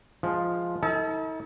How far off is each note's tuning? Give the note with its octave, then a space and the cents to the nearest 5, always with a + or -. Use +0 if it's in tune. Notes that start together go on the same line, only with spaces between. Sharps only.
F3 +0 G#3 +0
D#4 +45 A4 +30 A5 -30